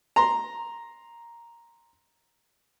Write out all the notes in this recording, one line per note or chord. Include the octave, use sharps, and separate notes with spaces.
A#5 C6